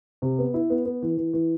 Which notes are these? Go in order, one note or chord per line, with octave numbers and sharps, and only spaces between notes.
C3
B3
E4
B3
B3
E3
E3
E3